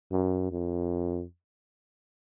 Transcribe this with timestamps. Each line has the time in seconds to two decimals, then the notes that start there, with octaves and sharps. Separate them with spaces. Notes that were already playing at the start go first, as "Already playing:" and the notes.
0.11 F#2
0.51 F2